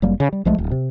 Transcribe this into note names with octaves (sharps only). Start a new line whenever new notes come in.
F1 F#3 G3 A#3
C#3
G3
B1 F3 G#3 A3
D1
C3